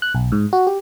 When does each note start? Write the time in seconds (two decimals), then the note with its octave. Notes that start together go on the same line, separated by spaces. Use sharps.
0.02 F#6
0.15 B1
0.32 G#2
0.53 F#4
0.67 G4